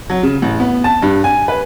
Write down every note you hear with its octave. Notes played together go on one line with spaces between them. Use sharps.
F#3
C#3
A1
B3
A5
G2
G#5
B4